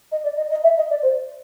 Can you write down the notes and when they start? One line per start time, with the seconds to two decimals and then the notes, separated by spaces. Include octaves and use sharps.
0.11 D#5
0.23 D5
0.36 D#5
0.50 D#5
0.63 E5
0.77 D#5
0.90 D5
1.02 C5